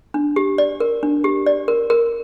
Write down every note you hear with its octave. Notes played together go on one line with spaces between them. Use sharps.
D4
G4
D5
A#4
D4
G4
D5
A#4
A#4